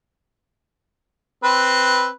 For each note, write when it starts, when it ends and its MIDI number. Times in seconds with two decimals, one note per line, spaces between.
1.44 2.08 60
1.44 2.08 71